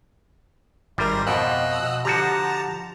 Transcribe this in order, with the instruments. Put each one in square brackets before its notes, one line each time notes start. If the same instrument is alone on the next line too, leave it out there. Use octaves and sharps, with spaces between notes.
[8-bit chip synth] G#1 A#4 [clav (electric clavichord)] G3 [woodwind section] E5 C6
[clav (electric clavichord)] F2 B2 F3 [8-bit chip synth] D#5 E6 F#6
[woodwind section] B2 [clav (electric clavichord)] F#5
[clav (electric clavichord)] D3 F3 F#4 [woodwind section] G4 [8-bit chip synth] A5 A#5